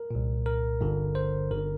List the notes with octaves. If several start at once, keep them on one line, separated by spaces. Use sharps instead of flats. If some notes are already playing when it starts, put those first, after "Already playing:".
Already playing: A#4
C2 A#2
A#4
G1 G2 D3
C5
G1 D3 A#4